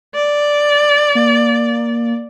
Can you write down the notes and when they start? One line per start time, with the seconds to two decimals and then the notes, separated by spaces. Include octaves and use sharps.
0.15 D5
1.15 A#3